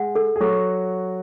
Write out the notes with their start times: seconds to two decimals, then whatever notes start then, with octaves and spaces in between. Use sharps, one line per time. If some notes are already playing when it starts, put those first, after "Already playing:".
Already playing: G#3 F#5
0.15 A4
0.36 G#4
0.40 F#3 F#4 A4